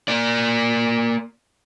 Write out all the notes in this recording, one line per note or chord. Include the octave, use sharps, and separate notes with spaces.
A#3 D5